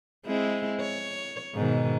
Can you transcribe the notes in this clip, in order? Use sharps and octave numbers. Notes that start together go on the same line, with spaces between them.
G#3 C4 E4
C#5
G#2 B2 D#3